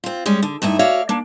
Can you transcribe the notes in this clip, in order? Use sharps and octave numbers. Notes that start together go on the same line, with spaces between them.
C4 F4
G3 G#3 C#4
D3
G2 A3 D#4 E4
F#4 C#5 D5 E5 F5
A#3 D4